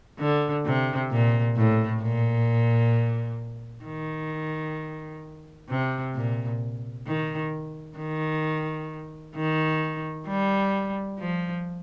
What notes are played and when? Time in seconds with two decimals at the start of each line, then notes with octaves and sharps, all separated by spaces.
0.19 D3
0.65 C3
1.11 A#2
1.56 A2
2.02 A#2
3.85 D#3
5.70 C3
6.15 A#2
7.07 D#3
7.98 D#3
9.36 D#3
10.27 G3
11.19 F3